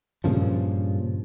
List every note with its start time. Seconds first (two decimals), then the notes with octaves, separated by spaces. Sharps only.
0.24 G2 A#2 C#3 F3